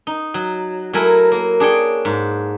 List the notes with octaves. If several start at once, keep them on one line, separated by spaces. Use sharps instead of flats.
D#4
F#3
F#3 A3 E4 A#4 G#5
A#3
D4 G#4 C#5 G5
G#2